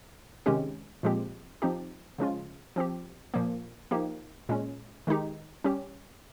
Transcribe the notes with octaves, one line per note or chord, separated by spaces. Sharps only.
C3 D#3 G#3 C#4 G4
A#2 F3 G#3 C4 G4
F3 C4 D#4 G4
C#3 F3 G#3 C#4 F4
F3 C4 G4
A#2 F3 A#3
F3 A#3 D#4 G4
A#2 G#3 C#4
D#3 G#3 D#4 G4
G3 C#4 G4